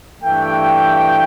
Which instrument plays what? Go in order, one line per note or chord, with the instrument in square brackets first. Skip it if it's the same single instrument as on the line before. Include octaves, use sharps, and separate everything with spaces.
[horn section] G2 E3 A3 G5